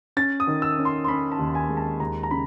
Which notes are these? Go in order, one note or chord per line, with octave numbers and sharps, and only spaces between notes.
C#4 A6
D#6
D#3
E6
C#4
C6
C6
C#4 B5
A5
D#2
G#5
G#3
A5
D#2 A#5
A#5
C#3 B5